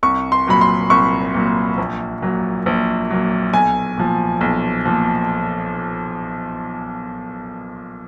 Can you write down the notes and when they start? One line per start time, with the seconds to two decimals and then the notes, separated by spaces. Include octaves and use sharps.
0.03 C2 C#6
0.32 C6
0.47 A#2 F#3 B5
0.61 C6
0.90 C2 C#6
1.34 A#2 F#3
1.78 A#1
2.22 A#2 F#3
2.66 A#1
3.10 A#2 F#3
3.53 B1 G#5
3.98 A#2 F3
4.41 B1
4.85 A#2 F3